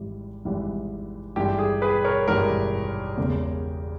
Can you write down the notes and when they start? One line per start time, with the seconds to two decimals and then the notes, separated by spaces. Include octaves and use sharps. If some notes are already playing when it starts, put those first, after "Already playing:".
Already playing: G#1 G#2 E3 G3
0.45 G#1 G#2 E3 G3
1.36 G#1 G2 E3 G#3 G4
1.58 G#4
1.82 G#4 B4
2.04 A#4 C#5
2.27 G#1 G2 E3 G#3 G4 A#4
3.17 E2 C#3 G#3 C#4